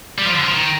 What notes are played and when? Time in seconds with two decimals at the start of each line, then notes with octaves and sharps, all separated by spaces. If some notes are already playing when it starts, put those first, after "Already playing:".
0.18 G3
0.26 F3
0.35 D3
0.44 F3
0.54 D#3